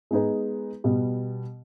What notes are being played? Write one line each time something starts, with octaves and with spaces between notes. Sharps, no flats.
G#3 B3 D#4 G#4 B4
B2 G3 B3